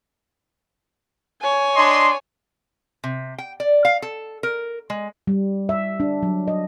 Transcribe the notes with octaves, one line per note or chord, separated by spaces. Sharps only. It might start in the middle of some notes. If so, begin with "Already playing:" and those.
C#5 G#5
D4 D#5 C6
C3
G5
D5
F5
A4
A#4
G#3
G3
E5
D4
F#3
D#5